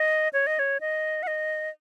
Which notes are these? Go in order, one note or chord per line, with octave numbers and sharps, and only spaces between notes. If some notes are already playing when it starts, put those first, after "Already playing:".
Already playing: D#5
C#5
D#5
C#5
D#5
F#5
D#5